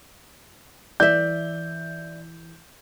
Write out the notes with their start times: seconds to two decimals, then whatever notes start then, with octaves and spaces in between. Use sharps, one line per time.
1.00 E3 D5 E5 G6